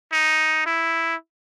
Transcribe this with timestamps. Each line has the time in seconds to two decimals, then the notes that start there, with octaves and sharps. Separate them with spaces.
0.12 D#4
0.66 E4